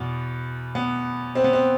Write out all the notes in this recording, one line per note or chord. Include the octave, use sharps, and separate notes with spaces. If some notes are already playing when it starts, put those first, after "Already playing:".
Already playing: E2 B2 B3
B3
C4
B3
C4